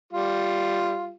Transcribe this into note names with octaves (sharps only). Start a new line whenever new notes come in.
G3 F4